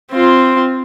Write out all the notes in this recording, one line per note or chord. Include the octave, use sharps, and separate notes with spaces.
C4 F4